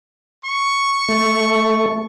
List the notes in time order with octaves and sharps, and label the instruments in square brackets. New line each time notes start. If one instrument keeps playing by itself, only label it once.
[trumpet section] C#6
[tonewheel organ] A3